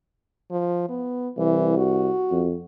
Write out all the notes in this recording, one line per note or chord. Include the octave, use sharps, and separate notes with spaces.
F3
B3
C2 E3
F#4
F2